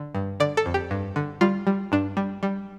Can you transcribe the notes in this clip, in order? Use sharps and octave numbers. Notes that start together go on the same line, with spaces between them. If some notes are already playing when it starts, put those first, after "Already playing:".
Already playing: D3
G2
D3 D5
A4
F2
G4
G2
D3
G3 F4
G3
G2 D4
G3
G3